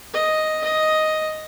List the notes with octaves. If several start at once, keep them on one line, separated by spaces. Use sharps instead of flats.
D#5
D#5